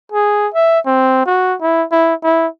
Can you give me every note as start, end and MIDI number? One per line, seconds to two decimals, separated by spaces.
0.12 0.48 68
0.54 0.79 76
0.86 1.26 60
1.26 1.55 66
1.61 1.84 64
1.92 2.14 64
2.23 2.47 64